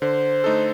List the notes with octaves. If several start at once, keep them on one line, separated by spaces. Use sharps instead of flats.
D3 C5
A3 D#4 A4